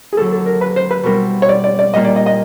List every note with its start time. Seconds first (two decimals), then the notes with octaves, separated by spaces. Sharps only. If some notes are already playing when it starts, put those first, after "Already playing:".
0.13 G#4
0.17 D#2 D3 F#3 A4
0.32 A4
0.46 A#4
0.61 B4
0.76 C5
0.91 B4
1.03 B2 G3 C4 E4 A#4
1.42 C#5
1.49 D5
1.64 D5
1.79 D5
1.94 A#2 G3 A#3 D#5
2.05 D5
2.16 D#5
2.26 D#5